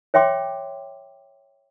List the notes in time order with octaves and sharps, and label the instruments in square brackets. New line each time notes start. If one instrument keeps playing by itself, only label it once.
[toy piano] C#5 E5 G5 C6 D6